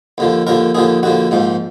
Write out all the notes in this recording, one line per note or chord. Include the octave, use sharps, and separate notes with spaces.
D#2 D3 F3
D#2 D3 F3 A#4
D#2 D3 F3 G#4
D#2 D3 F3 F#4
A#1 G#2 F3